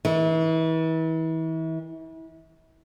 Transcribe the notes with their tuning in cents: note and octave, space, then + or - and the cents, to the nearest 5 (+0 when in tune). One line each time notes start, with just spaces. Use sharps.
E3 -35